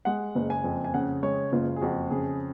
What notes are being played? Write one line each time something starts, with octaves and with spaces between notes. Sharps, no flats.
G#3 F#5
F#1
G#5
F2
G#5
C#3 F#5
G#3 C#5
F#1 F4
G#4
F2 F#4
C#3 G#4